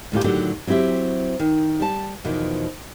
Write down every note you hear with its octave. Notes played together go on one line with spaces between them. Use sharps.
D2 A2 F4 G4
A2 D3 D#3 F#3 F#4 G4
F#3 C4 E4 G4 E5
D#3
G3 A5
E2 B2 D#3 F3